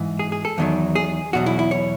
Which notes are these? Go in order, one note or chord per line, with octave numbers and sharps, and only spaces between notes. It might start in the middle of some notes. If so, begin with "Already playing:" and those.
Already playing: G#2 E3
G#4
G#4
A4
E2 D#3 F#3
G#4
E2 B2 F#3 F#4
E4
E4
C#5